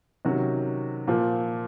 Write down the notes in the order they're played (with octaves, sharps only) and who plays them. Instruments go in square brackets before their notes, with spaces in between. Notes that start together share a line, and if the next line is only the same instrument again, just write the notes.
[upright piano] C3 D#3 F#3 C#4 F#4
A#2 F3 A#3